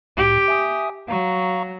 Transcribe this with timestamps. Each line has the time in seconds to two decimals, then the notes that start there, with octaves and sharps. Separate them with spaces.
0.17 C2 A2 G4
0.48 E5 G#5 D#6
1.08 F#3 F5 A#5 C#6